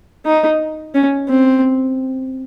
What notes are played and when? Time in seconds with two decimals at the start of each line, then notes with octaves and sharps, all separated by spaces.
0.25 D#4
0.95 C#4
1.29 C4